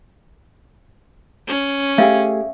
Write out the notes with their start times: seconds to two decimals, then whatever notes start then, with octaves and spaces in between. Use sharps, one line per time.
1.47 C#4
1.98 A3 G4 G#4 E5 F5